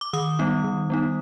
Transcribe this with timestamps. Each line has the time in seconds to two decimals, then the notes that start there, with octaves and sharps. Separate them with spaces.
0.01 D6
0.13 D#3 D#6
0.39 G3 B3 D#4
0.64 D#3
0.90 G3 B3 D#4